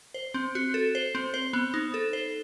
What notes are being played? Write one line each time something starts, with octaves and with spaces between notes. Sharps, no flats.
C5
C4
F#4
A4
C5
C4
C5
B3
D#4
A4
C5